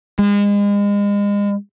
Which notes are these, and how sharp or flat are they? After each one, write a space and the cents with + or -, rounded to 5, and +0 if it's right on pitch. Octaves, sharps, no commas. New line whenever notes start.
G#3 -35